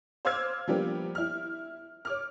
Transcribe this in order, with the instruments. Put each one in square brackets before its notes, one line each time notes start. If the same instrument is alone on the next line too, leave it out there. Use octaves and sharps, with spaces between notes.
[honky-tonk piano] C5 F5 D6 E6 F6 G#6
F3 G3 A#3 B3 D4 G4
E4 F6
C#5 D6 F6